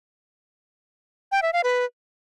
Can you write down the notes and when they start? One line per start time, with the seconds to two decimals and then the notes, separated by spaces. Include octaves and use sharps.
1.32 G5
1.42 E5
1.53 F5
1.64 B4